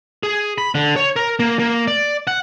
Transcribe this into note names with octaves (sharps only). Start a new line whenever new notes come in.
G#4
B5
D3
C#5
A#4
A#3
A#3
D5
F#5